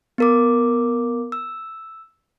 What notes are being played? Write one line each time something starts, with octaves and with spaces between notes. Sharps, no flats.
B3 A#4 D6
E6